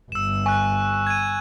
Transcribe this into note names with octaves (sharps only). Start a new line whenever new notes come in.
G1 E6 E7
G#5 C#6 F#6
G#6 D#7